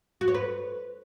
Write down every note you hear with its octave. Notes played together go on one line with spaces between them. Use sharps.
F#4
C#5
B4